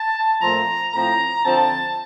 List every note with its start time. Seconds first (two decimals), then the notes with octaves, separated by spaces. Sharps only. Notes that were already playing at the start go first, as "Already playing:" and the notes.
Already playing: A5
0.41 A#2 F3 A3 C4 A#5
0.93 A2 F3 C4 A#5
1.45 D3 F3 C4 A5